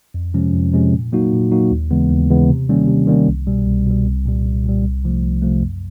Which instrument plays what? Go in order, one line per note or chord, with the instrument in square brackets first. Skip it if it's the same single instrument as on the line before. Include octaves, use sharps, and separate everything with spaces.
[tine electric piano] F2
C3 F3 G#3 C#4
F2
C3 F3 G#3 C#4
A#2
F#3 A#3 D#4 F#4
A#2
F#3 A#3 D#4 F#4
D#2
C#3 E3 G#3 B3
D#2
C#3 E3 G#3 B3
C3
D#3 G3 A#3 C#4
C3
D#3 G3 A#3 C#4
C2
B2 G3
C2
B2 G3
C2
A#2 G3
C2
A#2 G3
C2
C3 F3 A3
C2
C3 F3 A3
F#2